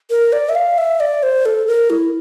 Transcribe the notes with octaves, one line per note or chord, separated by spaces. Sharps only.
A#4
D5
E5
F5
E5
D5
C5
A4
A#4
E4